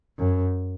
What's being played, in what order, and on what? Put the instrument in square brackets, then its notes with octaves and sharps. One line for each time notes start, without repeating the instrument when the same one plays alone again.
[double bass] F#2